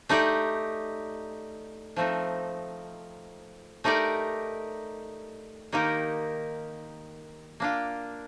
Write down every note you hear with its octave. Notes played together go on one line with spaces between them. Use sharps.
A3 D#4 G4 D5
F3 A3 C4 D#4
A3 D#4 G4 A#4 D5
D#3 A#3 D#4 G4 A#4
A#3 D4 F4